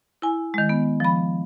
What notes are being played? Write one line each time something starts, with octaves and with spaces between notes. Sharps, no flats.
E4 G#5
D#3 G#3
B3
F3 B5